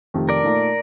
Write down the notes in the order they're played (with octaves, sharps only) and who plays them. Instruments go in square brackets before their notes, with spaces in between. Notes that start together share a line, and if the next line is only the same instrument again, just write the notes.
[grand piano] F2 C3 D#3 A3
[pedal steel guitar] A#4 D5
[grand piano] A#2 A3 D#4